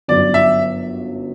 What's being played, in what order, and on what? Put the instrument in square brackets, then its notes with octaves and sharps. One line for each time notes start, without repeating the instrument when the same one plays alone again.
[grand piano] G1 F#2 D3 [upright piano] D5
[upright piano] E5